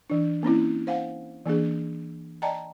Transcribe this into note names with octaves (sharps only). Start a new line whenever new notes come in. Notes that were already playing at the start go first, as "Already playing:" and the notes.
E3 D4
A#3 C4 C#4 E4
C5 F5 F#5 G#5
E3 A#3 D4 G#4
D5 D#5 G5 A5 A#5